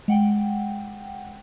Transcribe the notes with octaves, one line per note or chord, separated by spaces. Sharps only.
G#3 F#5 G5